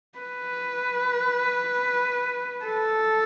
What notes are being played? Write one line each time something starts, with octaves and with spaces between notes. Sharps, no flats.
B4
A4